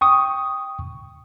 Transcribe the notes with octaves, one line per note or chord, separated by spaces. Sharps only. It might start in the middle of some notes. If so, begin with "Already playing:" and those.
G5 C#6 D#6